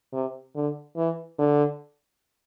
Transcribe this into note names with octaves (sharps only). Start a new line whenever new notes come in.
C3
D3
E3
D3